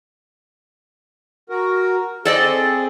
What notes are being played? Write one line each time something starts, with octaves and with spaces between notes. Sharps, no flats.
F#4 A#4
C4 G#4 A4 D5 D#5